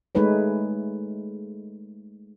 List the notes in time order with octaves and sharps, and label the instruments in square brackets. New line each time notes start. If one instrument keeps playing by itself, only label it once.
[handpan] G#3 A3 D#4 B4 C#5